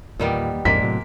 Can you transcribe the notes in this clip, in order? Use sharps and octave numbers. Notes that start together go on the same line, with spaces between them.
E2 A#2 D#3 G3 A#3 B3
A#1 F2 G#2 G#3 A#3 D5 B6
A2 C3 F#3